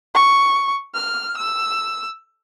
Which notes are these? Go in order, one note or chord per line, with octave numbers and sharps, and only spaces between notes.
C#6
F6
E6